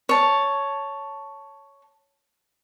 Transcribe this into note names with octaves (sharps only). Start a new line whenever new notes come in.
C#5 A5